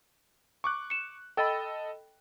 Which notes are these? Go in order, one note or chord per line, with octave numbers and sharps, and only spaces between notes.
C#6 D6 F#6
C#7 E7
A4 D#5 G5 B5 E6 A6